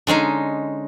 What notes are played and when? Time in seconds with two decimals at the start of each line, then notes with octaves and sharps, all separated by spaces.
0.07 D3 G#3 C#4 D#4